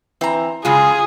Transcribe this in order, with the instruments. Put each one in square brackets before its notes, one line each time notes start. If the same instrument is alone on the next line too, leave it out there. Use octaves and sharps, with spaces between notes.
[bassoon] E3 [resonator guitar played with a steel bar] C4 A#5
[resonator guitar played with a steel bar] F#2 C#3 G#3 [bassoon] F4 [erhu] G#4